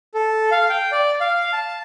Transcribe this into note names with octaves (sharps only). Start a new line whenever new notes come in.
A4
F5
G5
D5
F5
A5